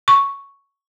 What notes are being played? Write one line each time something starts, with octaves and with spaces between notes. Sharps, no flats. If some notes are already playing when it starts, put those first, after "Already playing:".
C#6